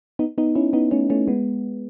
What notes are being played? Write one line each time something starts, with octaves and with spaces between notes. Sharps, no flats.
B3 D#4
B3 D#4
C#4 E4
B3 D#4
A3 C#4
A3 C#4
G#3 B3